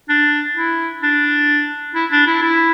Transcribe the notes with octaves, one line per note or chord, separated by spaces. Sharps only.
D4
E4
D4
E4
D4
E4
E4